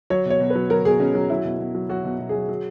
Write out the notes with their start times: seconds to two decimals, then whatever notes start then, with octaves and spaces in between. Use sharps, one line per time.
0.10 F#3 C#5
0.26 B2 C#5
0.40 B2
0.50 B4
0.55 F#3
0.70 F#3 A#4
0.85 B2 G#4
1.00 B2 C#4
1.15 F#3
1.30 F#3 E4
1.45 B2
1.59 B2
1.75 F#3
1.89 F#3 F#4
2.04 B2
2.19 B2
2.29 G#4
2.34 F#3
2.49 F#3